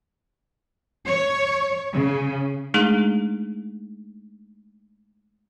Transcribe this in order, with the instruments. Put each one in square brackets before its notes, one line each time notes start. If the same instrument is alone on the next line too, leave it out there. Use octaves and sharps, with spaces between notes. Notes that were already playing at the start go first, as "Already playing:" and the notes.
[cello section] C#5
C#3
[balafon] G#3 A3 D4 D#4 G#4